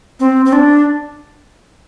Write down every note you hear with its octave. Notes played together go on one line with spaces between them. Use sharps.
C4
C4
D4